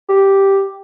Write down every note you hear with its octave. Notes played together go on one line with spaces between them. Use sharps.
G4